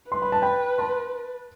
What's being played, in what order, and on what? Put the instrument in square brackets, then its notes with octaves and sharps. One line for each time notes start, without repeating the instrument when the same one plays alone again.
[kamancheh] B4 [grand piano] C6
[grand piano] B5
A5
G5 B5
A5 C6